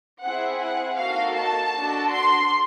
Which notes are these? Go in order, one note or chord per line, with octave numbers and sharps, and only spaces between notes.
C4 E4 G#4 F#5
F#5
A#3 D#4 F#4 A4 F5
A5
D4 F#4 A4
C6